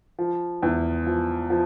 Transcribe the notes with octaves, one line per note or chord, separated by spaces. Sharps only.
F3
E2
F3
F3